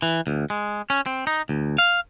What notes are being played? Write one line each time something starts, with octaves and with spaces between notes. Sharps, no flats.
E3
D2
G#3
C#4
C4
D#4
D2
F5